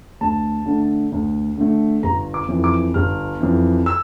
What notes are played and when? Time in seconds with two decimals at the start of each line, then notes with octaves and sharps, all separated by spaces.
0.21 D2 A5
0.66 D3 A3
1.12 D2
1.57 D3 A3
2.03 G1 A#5
2.34 D6
2.48 F2 E3
2.64 D6
2.94 G1 F6
3.40 F2 E3
3.86 E6